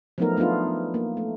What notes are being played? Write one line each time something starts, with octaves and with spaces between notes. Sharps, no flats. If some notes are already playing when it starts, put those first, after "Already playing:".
F3 F#3 A3 B3 D#4 A#4
A3 B3 D4 D#4 F4
A#3
A3